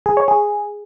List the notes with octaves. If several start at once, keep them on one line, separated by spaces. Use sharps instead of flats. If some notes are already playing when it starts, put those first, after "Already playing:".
G#4
C#5
G#4